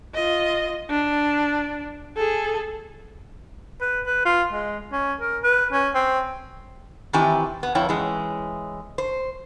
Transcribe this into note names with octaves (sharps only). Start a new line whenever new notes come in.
F4 D#5
D4
G#4 A4
B4
B4
F4
G#3
C#4
A#4
B4
C#4
C4
D#3 E3 C4 E4 G4 G#5
B3
F2 E4 C#5 G5
E3 G#3 C#4
C5